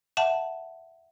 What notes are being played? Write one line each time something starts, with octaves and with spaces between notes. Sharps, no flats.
E5 F#5 A5